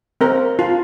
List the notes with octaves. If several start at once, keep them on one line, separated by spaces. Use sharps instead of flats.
C4 A#4
F4